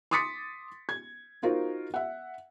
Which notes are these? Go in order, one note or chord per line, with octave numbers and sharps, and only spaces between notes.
C6 D6 D#6 A6 B6 C#7
G#6
D#4 F4 F#4 A#4 C5
E5 F#5